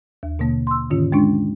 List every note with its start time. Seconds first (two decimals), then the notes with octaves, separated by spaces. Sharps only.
0.23 D#2
0.39 B2 D3 A#3
0.67 C6 E6
0.90 G#2 D3 D#3 C#4 F4
1.12 G#3 C#4 D4